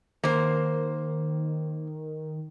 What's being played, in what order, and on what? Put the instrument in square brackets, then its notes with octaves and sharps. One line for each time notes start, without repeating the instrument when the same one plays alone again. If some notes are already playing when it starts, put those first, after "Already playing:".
[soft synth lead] D#3 [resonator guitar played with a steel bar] A#3 C5